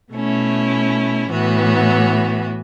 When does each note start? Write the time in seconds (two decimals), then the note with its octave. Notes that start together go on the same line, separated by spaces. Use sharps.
0.12 B2 A3 C#4 E4
1.29 A2 E3 B3 F#4